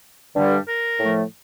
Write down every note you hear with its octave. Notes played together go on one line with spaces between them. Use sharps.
G2 D3 G3
A#4
A2 F3 A3